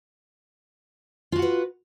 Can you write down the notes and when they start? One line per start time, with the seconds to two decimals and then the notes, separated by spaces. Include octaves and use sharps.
1.32 F4
1.36 F#4
1.39 F#5
1.42 B4